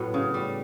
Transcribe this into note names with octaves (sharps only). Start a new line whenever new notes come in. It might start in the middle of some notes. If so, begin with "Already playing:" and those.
Already playing: A2 F#3 B3
C#3
G3